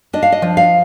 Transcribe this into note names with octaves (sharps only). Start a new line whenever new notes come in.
D4 D#5
F5
D#5
F3
F5